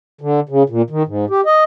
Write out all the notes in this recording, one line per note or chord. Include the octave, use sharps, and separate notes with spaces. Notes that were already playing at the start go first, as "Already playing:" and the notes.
D3
C#3
A#2
D#3
G#2
G4
D#5